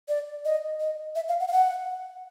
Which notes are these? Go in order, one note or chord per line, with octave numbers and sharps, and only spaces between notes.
D5
D#5
D#5
E5
F5
F#5
F5
F#5